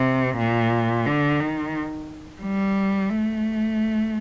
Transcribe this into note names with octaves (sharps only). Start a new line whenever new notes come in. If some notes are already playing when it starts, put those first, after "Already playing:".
Already playing: C3
A#2
D3
D#3
G3
A3